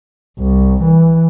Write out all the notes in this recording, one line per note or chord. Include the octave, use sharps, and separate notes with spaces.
C2
E3